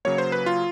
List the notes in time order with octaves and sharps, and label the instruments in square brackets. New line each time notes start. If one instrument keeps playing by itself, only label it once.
[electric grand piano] C#3 F#3 A#3 C#5
C5
B4
F4